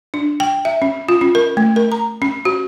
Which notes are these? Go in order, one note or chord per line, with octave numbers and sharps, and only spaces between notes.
D4
G5
E5
C#4
F4
C#4
A#4
A3
A#4
A#5
C#4
F#4